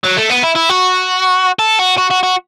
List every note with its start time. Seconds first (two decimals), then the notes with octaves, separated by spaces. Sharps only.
0.04 F#3
0.17 A3
0.29 B3
0.43 E4
0.55 E4
0.69 F#4
1.59 A4
1.79 F#4
1.98 F#4
2.11 F#4
2.23 F#4